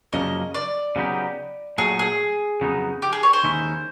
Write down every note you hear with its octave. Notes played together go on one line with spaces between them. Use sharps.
F#2 C#3 F3 A#3 D#5
D5
C#3 F#3 B3 D#4 G4
A#2 F#3 A3 G#4
G#4
F2 C#3 F#3 B3 D#4
G4
G#4
C#5
C5
D#2 D#3 G#3 C#4 E4